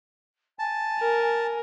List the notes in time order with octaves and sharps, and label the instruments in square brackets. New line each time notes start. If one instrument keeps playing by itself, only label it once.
[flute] G#5 [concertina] A5
[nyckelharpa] A#4